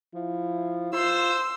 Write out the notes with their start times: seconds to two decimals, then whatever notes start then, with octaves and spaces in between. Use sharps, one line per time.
0.15 F3 E4
0.93 F4 C5 C6 E6